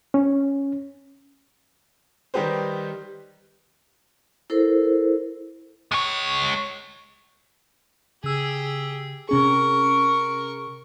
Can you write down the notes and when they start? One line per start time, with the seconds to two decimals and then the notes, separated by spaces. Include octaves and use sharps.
0.14 C#4
2.34 D#3 G3 D#4 G4 B4 C5
4.50 E4 A4 A#4 C5
5.92 G#3 C#5
8.24 C#3 G4 G#4 E6
9.29 C3 C#4 G#4 A#4 C#6